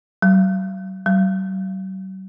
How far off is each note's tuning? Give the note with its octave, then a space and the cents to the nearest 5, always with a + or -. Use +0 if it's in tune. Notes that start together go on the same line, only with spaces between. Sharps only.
F#3 +40
F#3 +45